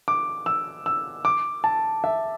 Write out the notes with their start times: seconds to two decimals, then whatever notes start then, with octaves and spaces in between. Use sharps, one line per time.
0.08 D6
0.46 E6
0.86 E6
1.25 D6
1.64 A5
2.04 E5